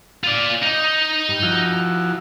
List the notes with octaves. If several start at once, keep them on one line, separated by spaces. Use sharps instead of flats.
F4 D5
D#4
G2
F3 E4 F#4